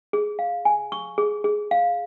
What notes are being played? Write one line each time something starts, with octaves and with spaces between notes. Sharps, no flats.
G#4
F5
G#5
C#6
G#4
G#4
F5